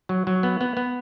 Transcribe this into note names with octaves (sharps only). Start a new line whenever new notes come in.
F#3
F#3
B3
B3
B3